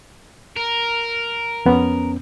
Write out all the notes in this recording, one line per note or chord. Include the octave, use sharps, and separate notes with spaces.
A#4
F2 B3 C#4